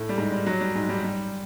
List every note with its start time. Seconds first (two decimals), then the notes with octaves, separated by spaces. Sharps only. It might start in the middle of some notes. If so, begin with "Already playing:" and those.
Already playing: A2 A3
0.09 G3
0.18 G#2 G#3
0.32 G3
0.46 F#3
0.61 G3
0.75 G#2 G#3
0.89 G3
1.04 G3